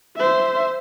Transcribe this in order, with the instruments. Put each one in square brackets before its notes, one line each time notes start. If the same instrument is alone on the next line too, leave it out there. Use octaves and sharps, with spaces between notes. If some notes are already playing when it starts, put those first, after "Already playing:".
[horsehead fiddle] C5 E5